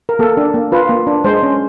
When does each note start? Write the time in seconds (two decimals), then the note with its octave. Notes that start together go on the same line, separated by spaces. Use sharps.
0.09 A#4
0.19 A#3 A4
0.37 D4
0.54 A#3
0.72 F4 B4
0.89 A#3
1.07 D4
1.24 G#3 C5
1.43 C#4